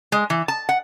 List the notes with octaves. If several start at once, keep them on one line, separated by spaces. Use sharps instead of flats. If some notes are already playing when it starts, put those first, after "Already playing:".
G#3
E3
A5
F#5